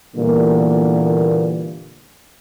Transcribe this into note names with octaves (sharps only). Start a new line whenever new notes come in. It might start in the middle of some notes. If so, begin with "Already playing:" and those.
A#2 D3 E3 G3 A#3 B3